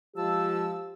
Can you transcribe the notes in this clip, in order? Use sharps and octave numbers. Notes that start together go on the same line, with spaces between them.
F3 G#3 G4 A5 E6